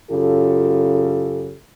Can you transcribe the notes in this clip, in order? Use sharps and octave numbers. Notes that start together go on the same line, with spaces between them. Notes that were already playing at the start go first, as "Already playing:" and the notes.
F#2 C#3 F4 G4 A4